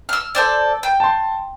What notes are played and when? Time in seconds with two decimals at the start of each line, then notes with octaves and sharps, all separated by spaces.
0.09 E6 F6
0.35 A4 C5 D5
0.83 G5
1.00 A5 C6